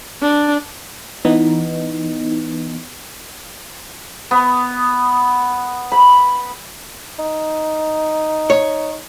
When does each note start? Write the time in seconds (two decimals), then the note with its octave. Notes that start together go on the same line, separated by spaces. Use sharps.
0.22 D4
1.25 E3 B3 D#4
4.31 B3
5.92 B5
7.19 D#4
8.50 C#5